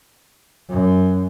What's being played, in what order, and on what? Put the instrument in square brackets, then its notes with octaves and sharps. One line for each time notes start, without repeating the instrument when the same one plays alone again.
[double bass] F#2